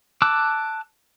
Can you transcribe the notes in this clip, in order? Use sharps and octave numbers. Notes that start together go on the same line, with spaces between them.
A5 D6 E6 F#6